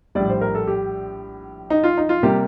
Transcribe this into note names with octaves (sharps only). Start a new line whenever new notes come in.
A#1 A2 G3 D5
C5
A#4
A4
G4
D#4
F4
D#4
F4
C3 G3 A#3 G4